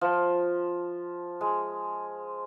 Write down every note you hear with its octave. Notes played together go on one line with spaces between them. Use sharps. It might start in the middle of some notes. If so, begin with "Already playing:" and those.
F3
G#3